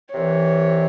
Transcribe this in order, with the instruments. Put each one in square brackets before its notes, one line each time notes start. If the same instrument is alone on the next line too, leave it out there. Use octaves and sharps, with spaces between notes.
[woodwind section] C2 C3 E3 C4 [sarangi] C#5